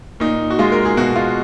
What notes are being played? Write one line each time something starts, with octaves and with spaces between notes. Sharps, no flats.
A#2 D#4
F#4
G#3 F4
A#4
G#4
B2 F#4
F4